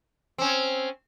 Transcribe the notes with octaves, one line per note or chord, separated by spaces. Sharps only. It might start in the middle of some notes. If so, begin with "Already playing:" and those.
C4 C#4